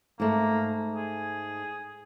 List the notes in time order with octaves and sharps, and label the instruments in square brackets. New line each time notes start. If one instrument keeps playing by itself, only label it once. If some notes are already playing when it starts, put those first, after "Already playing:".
[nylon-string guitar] G#2 A3 [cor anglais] A#3
[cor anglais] G#4